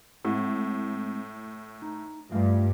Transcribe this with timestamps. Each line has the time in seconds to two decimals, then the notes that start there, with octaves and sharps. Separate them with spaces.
0.25 A2 G#3 C4 F#5
1.82 D#4
2.32 G2 A3 F4 F5